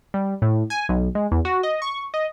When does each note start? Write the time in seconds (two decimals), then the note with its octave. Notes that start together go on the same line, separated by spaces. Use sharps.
0.14 G3
0.42 A2
0.70 G#5
0.89 B1
1.15 G#3
1.32 E2
1.45 F#4
1.63 D#5
1.82 C#6
2.14 D#5